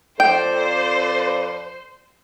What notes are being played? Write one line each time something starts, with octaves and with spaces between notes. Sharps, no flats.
F2 A4 C5 D5 G5